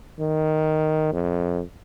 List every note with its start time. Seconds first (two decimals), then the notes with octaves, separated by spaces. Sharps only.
0.20 D#3
1.13 F2